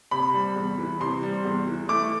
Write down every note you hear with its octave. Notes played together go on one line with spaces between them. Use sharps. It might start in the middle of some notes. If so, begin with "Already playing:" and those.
C3 B5
G3
E2
E3
C3 C6
G3
E2
E3
A3 D6